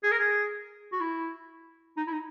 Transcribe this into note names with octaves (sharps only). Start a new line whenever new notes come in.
G#4
A#4
G#4
F#4
E4
D#4
E4
D#4